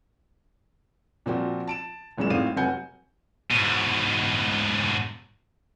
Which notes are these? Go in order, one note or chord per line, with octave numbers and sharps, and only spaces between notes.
A#2 F3 C4 F#4
A5 D7 E7
E1 F#2 A#2 G#3 E7
G#1 A2 C4 F5 D#7
F1 F#3 F#5 G#5 G6 C#7
G#2 B2